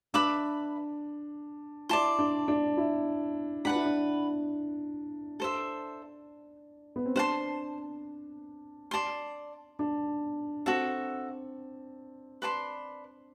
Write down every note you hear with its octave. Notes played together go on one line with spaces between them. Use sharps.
D4 B4 E5 B5 D6
E4 D5 A5 C6
D4
D4
E4
D4 B4 F#5 B5
E4
D4
A4 C5 E5
B3
C4
D4 C5 F#5 A5 C6
D5 A5 C6
D4
C4 F#4 A4 E5 A5
B4 D5 A5 C6